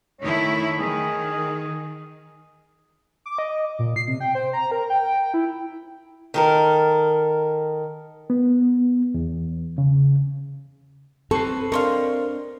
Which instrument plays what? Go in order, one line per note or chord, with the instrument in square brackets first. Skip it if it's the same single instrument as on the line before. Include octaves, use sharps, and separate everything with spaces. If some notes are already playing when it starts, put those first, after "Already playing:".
[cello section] D#3 A3 E4 [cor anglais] C#5
[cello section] D#3 [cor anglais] G#4
[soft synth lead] D6
D#5
A#2
C7
C3
G5
C5
A#5
A#4
G5
E4
[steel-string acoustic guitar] D#3 A4 A#4
[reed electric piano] B3
E2
C#3
[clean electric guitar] C4 B4 C6 [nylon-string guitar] A4 [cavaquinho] C#6
[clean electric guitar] C4 D4 D#5 [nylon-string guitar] A#4 [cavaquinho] F5 C6 C#6